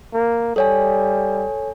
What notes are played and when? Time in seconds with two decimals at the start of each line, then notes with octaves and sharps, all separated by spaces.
0.14 A#3
0.56 G3 A4 C#5 G#5